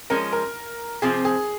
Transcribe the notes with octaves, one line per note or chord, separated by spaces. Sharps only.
F3 G#3 C#4 A#4
A#4
C3 F3 C4 F4 G#4
G#4